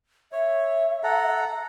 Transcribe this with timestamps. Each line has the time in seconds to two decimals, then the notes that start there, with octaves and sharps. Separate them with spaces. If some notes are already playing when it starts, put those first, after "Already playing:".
0.32 C#5 E5
1.03 A4 F#5 A#5